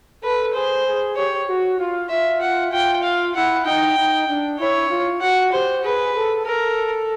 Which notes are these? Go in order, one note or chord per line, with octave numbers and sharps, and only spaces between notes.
A4 B4
G#4 C5
G#4
G4 C#5
F#4
F4
F4 E5
F#5
F4 G5
F5
E4 F#5
D#4 G5
D#4
D4
E4 C#5
F4
F#4 F#5
G4 C5
G#4 B4
A4
A4 A#4